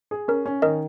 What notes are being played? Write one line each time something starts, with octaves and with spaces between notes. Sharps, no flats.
G#4
C#4 A#4
C#4
D#3 A#4 D#5